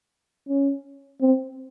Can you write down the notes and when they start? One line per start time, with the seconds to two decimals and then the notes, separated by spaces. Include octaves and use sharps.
0.49 C#4
1.22 C4